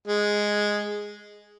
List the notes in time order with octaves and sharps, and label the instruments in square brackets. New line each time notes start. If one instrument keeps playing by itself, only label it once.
[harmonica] G#3